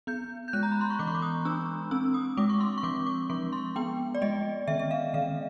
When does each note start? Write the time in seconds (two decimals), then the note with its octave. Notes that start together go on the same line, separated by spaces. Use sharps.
0.07 B3 G6
0.48 G6
0.53 G#3 F#6
0.63 A#5
0.72 B5
0.81 C6
0.90 C#6
0.99 E3 D6
1.07 C#6
1.15 D6
1.22 D#6
1.45 D4 E6
1.91 C4 E6
2.14 D#6
2.37 G#3 D6
2.49 C#6
2.60 C6
2.78 C#6
2.83 F3 D6
3.07 D6
3.30 F3 C#6
3.53 C6
3.76 B3 G5
4.15 D5
4.22 G#3 D#5
4.67 D#3 E5
4.79 E5
4.91 F5
5.14 D#3 F5